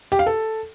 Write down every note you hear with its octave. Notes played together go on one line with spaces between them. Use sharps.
G4
F5
A4